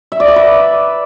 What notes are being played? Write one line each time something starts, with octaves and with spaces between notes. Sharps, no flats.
E5
D5
D6
B4